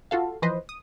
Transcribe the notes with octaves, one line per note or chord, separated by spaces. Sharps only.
F4 F#4 A4 F5
E3 F3 B4 C5 D#5
D#6